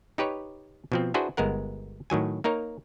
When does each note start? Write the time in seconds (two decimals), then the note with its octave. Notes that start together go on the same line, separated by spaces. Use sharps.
0.18 D#4 G4 B4 C#5
0.92 B2 F3 C4
1.14 D4 E4 F#4 G#4 B4 C5
1.37 G1 G#3 B3 A#4 F#5
2.10 A2 D#3 F#3 G#5
2.44 A#3 D#4 A#4 C#5